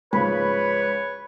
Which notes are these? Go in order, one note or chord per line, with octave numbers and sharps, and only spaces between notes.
G#2 C#3 F3 B4 C#5 B5